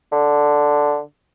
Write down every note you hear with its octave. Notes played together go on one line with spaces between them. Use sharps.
D3